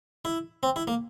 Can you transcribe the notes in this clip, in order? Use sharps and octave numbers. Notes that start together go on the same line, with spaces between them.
E4
C4
E4
A#3